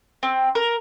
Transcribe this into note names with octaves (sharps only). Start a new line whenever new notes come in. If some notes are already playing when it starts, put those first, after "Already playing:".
C4
A#4